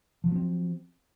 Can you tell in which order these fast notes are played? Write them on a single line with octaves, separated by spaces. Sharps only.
F3 F#3 B3 C4